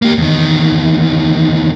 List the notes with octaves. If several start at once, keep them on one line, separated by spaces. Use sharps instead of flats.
A#3 G4
E2 D#3